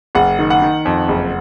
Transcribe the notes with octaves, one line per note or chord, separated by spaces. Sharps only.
F#1 F#5
D#3
F#5
D#3
F2
F#1